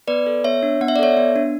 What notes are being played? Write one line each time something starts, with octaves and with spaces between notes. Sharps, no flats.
B3 B4 D5
A4
B3 C#5 E5
D4
B3 F#5
E5
D5
A4 C#5 E5
B3
D4